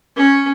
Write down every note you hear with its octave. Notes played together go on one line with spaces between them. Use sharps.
C#4